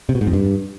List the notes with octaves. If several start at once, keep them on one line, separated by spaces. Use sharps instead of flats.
C3
B2
G#2
F2
G2